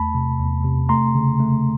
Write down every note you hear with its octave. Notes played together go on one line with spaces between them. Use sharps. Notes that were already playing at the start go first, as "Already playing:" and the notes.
Already playing: E2 A3 A5 B5
C3
E2
C3
A3 A#5 C6
C#3
A3